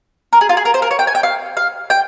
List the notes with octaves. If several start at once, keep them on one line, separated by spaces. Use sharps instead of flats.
A#4
G#4
F4
G#4
A#4
C5
A#4
C#5
G5
G#5
G5
F5
F5
G5